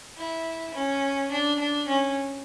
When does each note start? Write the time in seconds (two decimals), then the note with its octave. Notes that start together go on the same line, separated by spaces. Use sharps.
0.17 E4
0.74 C#4
1.31 D4
1.59 D4
1.88 C#4